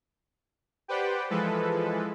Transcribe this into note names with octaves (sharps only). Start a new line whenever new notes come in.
G4 B4 C5 D5 F#5 G5
E3 F3 G#3 A4 B4